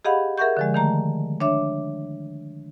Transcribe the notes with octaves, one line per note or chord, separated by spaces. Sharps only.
G4 G#4 D#5 F5 F#5 B5
G#4 A#4 E5 F#5 C#6 G6
D3 F3 G#3
D#3 A3 A#5
D4 C#5 E5 D6